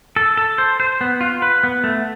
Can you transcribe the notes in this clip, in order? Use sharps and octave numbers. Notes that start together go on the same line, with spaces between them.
A4
A4
C5
C5
B3
F4
B4
B3
A3